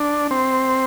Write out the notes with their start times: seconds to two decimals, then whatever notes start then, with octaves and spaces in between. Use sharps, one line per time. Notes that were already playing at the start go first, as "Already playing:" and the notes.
Already playing: D4
0.31 C4